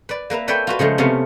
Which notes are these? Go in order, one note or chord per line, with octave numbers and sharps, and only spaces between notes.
B4 D5
A#3 B4 E5 A#5
A4 B4 C#5 D5 E5 G5
F4 F#4 B4
C#3 F3 G#3 A3
C3 A3 B3 C#4 F5